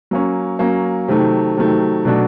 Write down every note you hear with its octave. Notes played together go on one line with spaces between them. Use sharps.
F#3 A#3 C#4
F#3 A#3 C#4
C3 D#3 F#3 A3
C3 D#3 F#3 A3
B2 F#3 A3 D4 F#4